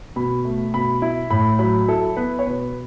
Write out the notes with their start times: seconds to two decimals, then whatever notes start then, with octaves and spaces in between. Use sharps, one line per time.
0.16 B2 B5
0.45 A3
0.74 B2 B5
1.02 E4
1.30 A2 B5
1.59 F#3 B5
1.88 E4 A4
2.16 B3 B4
2.39 C#5
2.46 B2 B4